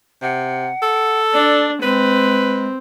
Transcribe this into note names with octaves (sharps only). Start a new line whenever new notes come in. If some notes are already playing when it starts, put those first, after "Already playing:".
C3 F#5
A4
D4 D5
G#3 C4 B4